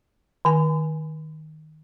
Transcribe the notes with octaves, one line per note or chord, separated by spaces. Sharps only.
D#3 G#5